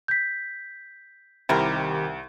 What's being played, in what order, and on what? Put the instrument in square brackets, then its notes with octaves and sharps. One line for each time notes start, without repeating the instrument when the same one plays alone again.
[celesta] G6 B6
[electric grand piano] C2 [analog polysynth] D#3 G4 [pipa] C4 E4 A#4